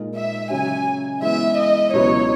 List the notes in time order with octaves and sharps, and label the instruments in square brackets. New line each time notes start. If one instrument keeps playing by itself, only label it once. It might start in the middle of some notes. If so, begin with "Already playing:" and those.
Already playing: [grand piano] A#2 G#3 D#4 A#4 D#5
[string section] E5
[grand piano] C#3 F#3 C#4 [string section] G#5
[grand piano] E3 G#3 B3 [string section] E5
[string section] D#5
[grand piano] C#2 B2 F#3 B3 E4 [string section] C#5